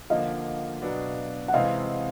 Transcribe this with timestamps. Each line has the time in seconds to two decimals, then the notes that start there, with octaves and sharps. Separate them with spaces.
0.10 D3 F3 A#3 D#5 F5
0.82 B2 F#3 B3 D4
1.48 F#5
1.53 C3 E3 G#3 C4 D#5 F5